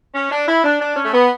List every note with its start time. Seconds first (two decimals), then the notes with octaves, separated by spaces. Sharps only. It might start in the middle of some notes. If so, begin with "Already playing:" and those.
0.14 C#4
0.32 D4
0.48 E4
0.64 D4
0.81 D4
0.96 C#4
1.04 A3
1.13 B3